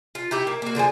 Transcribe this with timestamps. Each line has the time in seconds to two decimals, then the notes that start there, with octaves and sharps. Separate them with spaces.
0.15 F4
0.31 D#4 E4 G4 E5
0.47 A#3
0.62 A#3 F#4
0.75 D3 F3 G#3 G#5